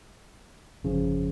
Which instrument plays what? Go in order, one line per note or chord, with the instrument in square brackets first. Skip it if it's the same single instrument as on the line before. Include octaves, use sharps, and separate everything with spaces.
[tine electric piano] G1 F2 C#3 F3